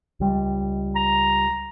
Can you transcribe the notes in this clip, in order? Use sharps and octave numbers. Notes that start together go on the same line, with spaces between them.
C#2 G3
A#5